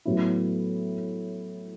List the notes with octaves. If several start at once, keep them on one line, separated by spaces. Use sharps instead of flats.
A2 F#3 B3 E4